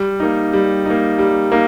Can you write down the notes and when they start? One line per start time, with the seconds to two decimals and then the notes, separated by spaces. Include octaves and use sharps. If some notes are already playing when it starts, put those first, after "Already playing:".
Already playing: G3
0.20 A#3 D#4
0.53 G3
0.86 A#3 D#4
1.18 G3
1.52 A#3 D#4